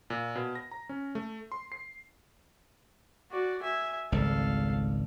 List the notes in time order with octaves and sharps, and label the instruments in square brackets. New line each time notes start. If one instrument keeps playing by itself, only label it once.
[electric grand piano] A#2
B2
A#6
A#5
C#4
A3
C6
C7
[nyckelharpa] F#4 D5
E5 G#5
[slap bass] G#1 C#2 G3 [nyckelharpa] A4 F5